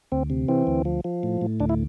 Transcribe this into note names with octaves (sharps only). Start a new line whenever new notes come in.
D2 C4
C3
E3 C4
D2
F3
F3
A2
A2
D2 D4
E4